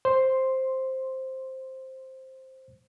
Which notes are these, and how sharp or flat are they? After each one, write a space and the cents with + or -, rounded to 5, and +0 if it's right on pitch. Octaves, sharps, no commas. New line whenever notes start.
C5 +5 C6 +0